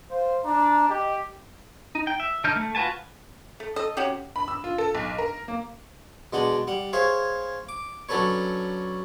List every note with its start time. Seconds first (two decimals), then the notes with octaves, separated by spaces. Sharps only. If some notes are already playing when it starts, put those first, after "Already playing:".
0.11 C5 F5
0.45 D4 A#5
0.89 G4 D#5
1.95 D#4
2.07 G5
2.20 E5
2.44 D3 D4 D#4 F6 G6
2.56 A3
2.75 F4 F#4 B4 G#5 A5
3.60 A3
3.76 A4 D#5
3.97 C3 C#4 F#4 G4
4.36 B5
4.48 E6
4.64 F4
4.78 A4
4.95 B1
5.18 A#4
5.48 A#3
6.33 B2 G#3 D4 F#5
6.67 G3 F#5
6.93 G#4 C5 C#5 E5 F5
7.69 D6
8.09 F#3 C#4 D4 A4 B4 C#5